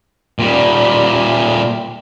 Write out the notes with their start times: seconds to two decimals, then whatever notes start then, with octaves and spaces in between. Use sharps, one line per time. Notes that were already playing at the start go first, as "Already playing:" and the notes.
0.39 A#2 G3